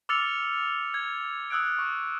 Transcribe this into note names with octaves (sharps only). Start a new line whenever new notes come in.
D6 E6 F6 A6 C#7 F7
G#6
D#6 E6 F#6 G#6 D7
C#6